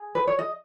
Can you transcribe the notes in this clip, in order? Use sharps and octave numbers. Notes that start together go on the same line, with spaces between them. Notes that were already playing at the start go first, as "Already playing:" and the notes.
Already playing: G#4
B4
C#5
D#5